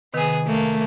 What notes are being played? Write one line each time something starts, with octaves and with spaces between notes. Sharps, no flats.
C3 D#3 B3 G#4 B4
A3 A#3